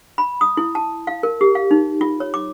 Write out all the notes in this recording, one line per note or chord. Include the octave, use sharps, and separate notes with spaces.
B5
D#6
E4
A5
F5
A#4
G4
F5
D#4
F4
C#5
D6